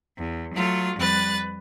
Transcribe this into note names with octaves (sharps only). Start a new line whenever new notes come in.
E2
F#3 A3 F4
F2 G3 B4 F#6 A6